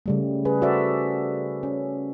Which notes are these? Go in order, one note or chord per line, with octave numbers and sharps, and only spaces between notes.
C#3 G3 A3
G#4 B4
F#4 A4 C5 D5 E5
C#4